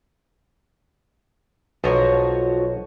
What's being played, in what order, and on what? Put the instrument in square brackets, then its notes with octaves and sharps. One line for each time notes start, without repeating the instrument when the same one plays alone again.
[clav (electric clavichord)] B1 A#5 [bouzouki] F3 F#4 C#5